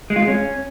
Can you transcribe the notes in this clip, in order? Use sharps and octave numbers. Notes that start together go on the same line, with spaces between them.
G#3
F4
G#3
C#4